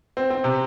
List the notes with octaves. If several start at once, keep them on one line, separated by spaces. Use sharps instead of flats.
C4
C4
C3